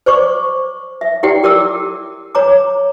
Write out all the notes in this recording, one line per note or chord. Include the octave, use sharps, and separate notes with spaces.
C5 D5 C#6 D6
E5
E4 G4 D5 F#5 G5
G4 A#4 D5 D6 E6
C#5 A#5 D6